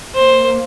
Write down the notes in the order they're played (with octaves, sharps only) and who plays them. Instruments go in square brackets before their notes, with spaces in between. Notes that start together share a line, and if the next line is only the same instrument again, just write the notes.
[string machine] A#3 [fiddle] C5